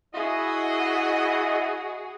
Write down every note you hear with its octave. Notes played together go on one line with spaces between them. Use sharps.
E4 F#4 G#4 D#5